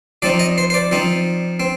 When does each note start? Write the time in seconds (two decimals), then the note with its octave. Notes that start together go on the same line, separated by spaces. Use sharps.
0.22 F3 C4 D#4 D5
0.39 D#5
0.58 C5
0.70 C5
0.74 D5
0.92 F3 C4 D#4
1.60 C4